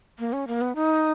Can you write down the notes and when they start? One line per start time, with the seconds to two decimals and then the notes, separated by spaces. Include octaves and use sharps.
0.19 A#3
0.33 C#4
0.48 A#3
0.61 B3
0.75 D#4